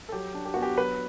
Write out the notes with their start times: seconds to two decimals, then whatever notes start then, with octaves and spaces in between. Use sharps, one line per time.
0.09 A4
0.12 F#3 G4
0.35 D4
0.45 G4
0.54 B3 F#4
0.62 G4
0.77 F#3 B4